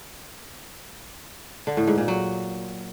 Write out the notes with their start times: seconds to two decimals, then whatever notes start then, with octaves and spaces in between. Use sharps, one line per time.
1.67 D3
1.77 A2
1.87 G#2
1.98 A#2
2.08 F#3